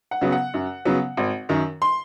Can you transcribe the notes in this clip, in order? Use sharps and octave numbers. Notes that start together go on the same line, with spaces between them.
F#5
C#3 F#3 B3
F#5
F#2
C#3 F#3 B3
G#1
F#2 D#3
C6